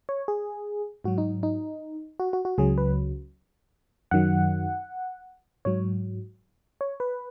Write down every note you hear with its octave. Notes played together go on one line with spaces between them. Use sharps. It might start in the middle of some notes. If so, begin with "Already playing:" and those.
C#5
G#4
G#2 F#3 F#4
D#4
D#4
F#4
F#4
F#4
C#2 C#3 F#3 G#4
B4
F#2 D#3 F#3 F#5
G#2 F#3 C#5
C#5
B4